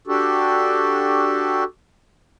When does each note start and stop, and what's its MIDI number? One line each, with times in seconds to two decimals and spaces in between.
0.07 1.64 62
0.07 1.64 66
0.07 1.64 67
0.07 1.64 69